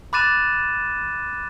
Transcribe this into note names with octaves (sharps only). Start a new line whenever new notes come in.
B5 D6 F#6 A6 D#7 E7